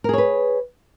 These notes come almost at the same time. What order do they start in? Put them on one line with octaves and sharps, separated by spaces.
A#4 G#4 C#5 B4